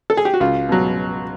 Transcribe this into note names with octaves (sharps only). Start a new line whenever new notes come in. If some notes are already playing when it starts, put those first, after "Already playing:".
A4
G#4
G4
F#4
C#2 F4
B2 F#3